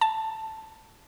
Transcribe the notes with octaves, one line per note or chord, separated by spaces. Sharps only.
A5